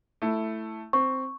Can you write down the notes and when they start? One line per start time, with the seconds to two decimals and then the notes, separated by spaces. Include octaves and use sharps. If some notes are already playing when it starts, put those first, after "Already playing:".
0.22 A3 E4
0.93 C4 C#6